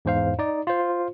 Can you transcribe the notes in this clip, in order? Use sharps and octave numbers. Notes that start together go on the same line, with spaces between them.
E2 G#2 C5 F5
D#4 D5
F4 C5